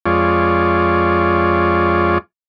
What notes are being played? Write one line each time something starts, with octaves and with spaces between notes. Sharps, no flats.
F2 G#3 F4 C#5 D5